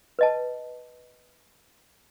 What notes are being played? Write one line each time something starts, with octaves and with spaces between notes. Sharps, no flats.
B4 D#5 A5